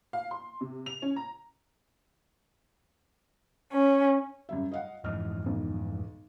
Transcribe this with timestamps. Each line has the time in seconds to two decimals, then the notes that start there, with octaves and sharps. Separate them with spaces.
0.13 F5
0.31 C6
0.61 C3
0.86 F7
1.02 C#4
1.16 A#5
3.71 C#4
4.49 F#2 G3 E5
4.72 D#5 F5 F#5
5.04 F2 G#2 E3 D#5 F6
5.46 B1